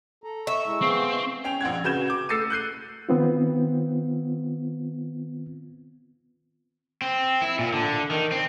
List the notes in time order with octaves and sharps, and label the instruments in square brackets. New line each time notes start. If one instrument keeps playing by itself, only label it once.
[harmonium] A4 A#5
[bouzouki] E5 [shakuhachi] C#6
[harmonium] G#3 E4
[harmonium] B3 G#4 F5 [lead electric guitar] C4
[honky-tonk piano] C#4 G5 F7
A#1 C4 F#5 G#6
C#3 F#4 B4 G6 G#6 E7
D6 G6
A3 E6 A6 C7 C#7 D#7
F#6 G6 C7 D#7
[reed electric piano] D#3 B3 C4 F4
[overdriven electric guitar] C4
E4
A#2
D3
D#3
C4